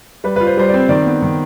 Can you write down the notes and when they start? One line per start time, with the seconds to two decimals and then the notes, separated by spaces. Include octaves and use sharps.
0.24 G3 B4
0.36 F4 B4
0.47 C5
0.57 G3 C5
0.68 D5
0.74 C4
0.89 D#3 D5
1.06 B3
1.22 D#3